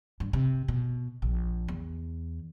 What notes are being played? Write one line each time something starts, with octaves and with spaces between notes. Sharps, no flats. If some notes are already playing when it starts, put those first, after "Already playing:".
G2
C3
B2
A#1
E2